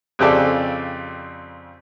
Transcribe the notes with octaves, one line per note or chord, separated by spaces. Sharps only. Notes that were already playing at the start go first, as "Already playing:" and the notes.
F2 C#3 C4 G4 A4 D5